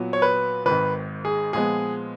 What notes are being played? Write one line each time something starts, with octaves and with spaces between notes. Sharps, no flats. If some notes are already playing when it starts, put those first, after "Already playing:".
Already playing: A#2 F#3 B3
C#5
B4
G#1 G#2 D#3 B4
G#4
A#2 F3 G#3 B3 G#4